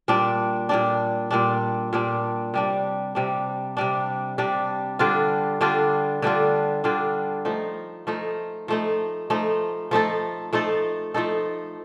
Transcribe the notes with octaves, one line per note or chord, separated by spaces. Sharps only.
A#2 G3 D4
A#2 G3 D4
A#2 G3 D4
A#2 G3 D4
C3 G3 D4
C3 G3 D4
C3 G3 D4
C3 G3 D4
D3 G3 D4 F4
D3 G3 D4 F4
D3 G3 D4 F4
D3 G3 D4 F4
F3 A3 D#4
F3 A3 D#4
F3 A3 D#4
F3 A3 D#4
F3 A3 D#4 A4
F3 A3 D#4 A4
F3 A3 D#4 A4